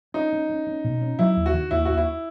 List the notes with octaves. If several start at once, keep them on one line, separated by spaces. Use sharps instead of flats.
C#4 D#4
C#4
C#4
C#4
B2
C#4
F#3 E4
D#2
F#4
D#3
D#2 E4
D#2 F#4
E4